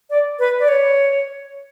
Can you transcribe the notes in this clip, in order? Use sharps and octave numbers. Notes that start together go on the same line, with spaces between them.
D5
B4
D5
C#5